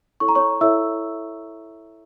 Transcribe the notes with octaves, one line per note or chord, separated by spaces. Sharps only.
E4 A4 C#5 C#6
A#5
C#5 C#6
E4 A4 C#5 E5 E6